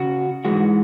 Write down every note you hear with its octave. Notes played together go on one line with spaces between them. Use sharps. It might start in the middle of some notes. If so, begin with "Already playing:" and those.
Already playing: C#3 F#4
G#2 E3 G#3 F#4